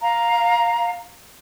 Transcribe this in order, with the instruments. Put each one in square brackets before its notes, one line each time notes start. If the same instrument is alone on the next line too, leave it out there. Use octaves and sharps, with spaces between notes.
[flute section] F5 A#5